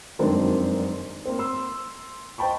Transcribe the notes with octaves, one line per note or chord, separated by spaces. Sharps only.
F1 F#2 D#3 G#3 C4 D4
A#3 C4
C6 E6
C5 D#5 G5 A5 B5 C#6